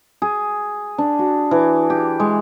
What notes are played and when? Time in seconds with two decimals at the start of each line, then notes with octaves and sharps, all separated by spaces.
0.22 G#4
0.98 D4
1.19 F#4
1.51 E3
1.90 G4
2.20 G#3